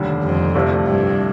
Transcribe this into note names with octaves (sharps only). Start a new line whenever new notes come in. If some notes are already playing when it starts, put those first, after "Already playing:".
Already playing: F1 D#2 D3 G3
F2
C2 C3 F3 A3
G2